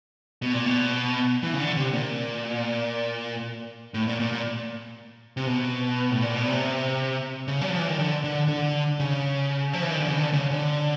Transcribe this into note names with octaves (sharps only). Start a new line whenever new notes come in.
B2
A#2
B2
E3
C#3
D3
C3
A#2
A2
A#2
A#2
A#2
C3
B2
A2
A#2
B2
C3
C#3
F#3
F3
E3
D#3
D3
D3
D3
C#3
F3
E3
D#3
D3
C#3
D3
C#3
D3